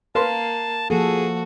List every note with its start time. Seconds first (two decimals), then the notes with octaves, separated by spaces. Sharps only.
0.15 A#3 A#4 B4 F5 A5 C6
0.90 F3 A#3 F#4 G#4 A4